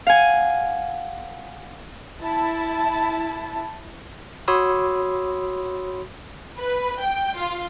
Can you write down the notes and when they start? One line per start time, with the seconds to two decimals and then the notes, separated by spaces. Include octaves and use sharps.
0.07 F5 F#5 G#5
2.21 E4 A5
4.48 F#4 C#5 B5 C6 D#6 E6
6.58 B4
7.03 G5
7.38 F4